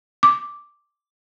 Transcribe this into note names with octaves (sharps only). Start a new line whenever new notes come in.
D6